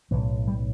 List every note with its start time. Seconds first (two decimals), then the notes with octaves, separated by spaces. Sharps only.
0.11 B1 A2 E3
0.47 G3